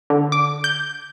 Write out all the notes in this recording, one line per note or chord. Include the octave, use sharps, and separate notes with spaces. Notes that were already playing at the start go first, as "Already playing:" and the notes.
D3
D6
G6